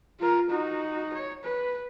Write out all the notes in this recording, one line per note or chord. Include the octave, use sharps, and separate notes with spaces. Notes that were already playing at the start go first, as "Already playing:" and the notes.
F4 A#4
D#4 F#4
C#5
B4